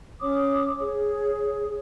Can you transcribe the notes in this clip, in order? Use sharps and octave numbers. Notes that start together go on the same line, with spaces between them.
C#4 C#5 D6 D#6
G#4 C#5